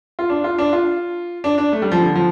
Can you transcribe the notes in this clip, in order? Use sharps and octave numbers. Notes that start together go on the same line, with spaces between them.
F4
D4
F4
D4
F4
D4
D4
A3
G3
F3
D3
F3